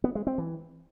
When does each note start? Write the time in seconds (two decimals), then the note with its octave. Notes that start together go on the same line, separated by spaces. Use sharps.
0.04 B3
0.15 G#3
0.27 C4
0.38 E3